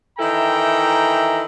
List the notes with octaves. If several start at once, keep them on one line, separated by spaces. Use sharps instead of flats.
D#3 E3 E4 A4 G5 A#5